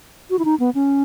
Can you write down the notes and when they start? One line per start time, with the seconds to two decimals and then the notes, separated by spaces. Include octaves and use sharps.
0.30 F#4
0.39 E4
0.45 D#4
0.60 B3
0.75 C#4